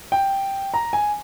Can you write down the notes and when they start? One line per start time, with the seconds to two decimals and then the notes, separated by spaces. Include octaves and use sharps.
0.12 G5
0.74 A#5
0.93 G#5